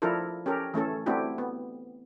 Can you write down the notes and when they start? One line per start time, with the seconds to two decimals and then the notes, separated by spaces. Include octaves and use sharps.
0.02 F3 D4 E4 F4 A4 A#4
0.46 C#4 G4 A4 A#4
0.74 E3 A3 C#4 A4
1.06 A3 C4 D4 E4 F#4 G4
1.38 B3